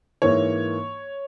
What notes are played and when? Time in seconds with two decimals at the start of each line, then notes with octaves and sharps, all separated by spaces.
0.22 G#2 E3 A#3 C#5